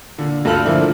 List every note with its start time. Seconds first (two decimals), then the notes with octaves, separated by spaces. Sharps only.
0.18 A#2 D3
0.45 D2 G2 F4 A4 F6 F#7
0.65 A#2 D3 F3 A#3 E4